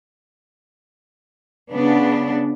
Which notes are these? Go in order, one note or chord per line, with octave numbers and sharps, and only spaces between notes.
C#3 B3 D4